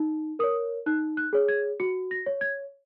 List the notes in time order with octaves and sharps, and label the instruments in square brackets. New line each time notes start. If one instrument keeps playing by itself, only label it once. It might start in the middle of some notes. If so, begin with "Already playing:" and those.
Already playing: [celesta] D#4
A#4 C#5 D#6
D#4 F#6
F#6
G#4 C#5
G#6
F#4 C#7
A#6
C#5
G#6